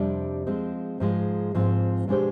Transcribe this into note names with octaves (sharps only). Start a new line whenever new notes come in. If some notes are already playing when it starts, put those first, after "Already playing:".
Already playing: F2 C3 G3 D4
F3 G#3 C4
G#2 F3 G#3
G#2 F3 C4
B2 G#3 D4 G4 C5